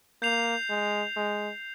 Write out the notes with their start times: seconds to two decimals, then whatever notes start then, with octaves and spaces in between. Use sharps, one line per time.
0.22 A#3 G6 C7 F7
0.70 G#3
1.16 G#3